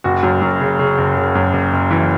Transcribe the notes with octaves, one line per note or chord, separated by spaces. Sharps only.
F#1 F#4
F#2
F#2
C#3
C#3
F#1
C#3
F#2
F#1
F#1
E3